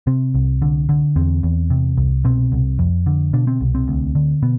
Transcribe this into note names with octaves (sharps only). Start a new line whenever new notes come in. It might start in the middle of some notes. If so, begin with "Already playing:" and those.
C3 C4
C2
D3
D3
E2 C4
E2
C3
C2
B2 C4
C2
F2
D3
B2 D4
C4
C2
C4
D2
D3
B2 B3